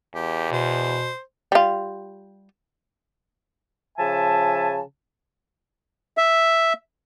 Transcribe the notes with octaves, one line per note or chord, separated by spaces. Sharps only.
E2 G4
B2 C5
G3 F4
C#3 F3 E5 G#5 A5
E5